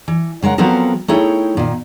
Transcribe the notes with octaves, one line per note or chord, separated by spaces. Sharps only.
E3
C#3 G#3 A#4 F#5
F3 F#3 B3 C4 A4 A#4
A3 D#4 E4 G#4 C#5 G5
A#2 D#3